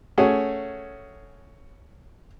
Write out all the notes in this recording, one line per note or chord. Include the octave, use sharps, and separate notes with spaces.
A3 C#4 F#4 G#4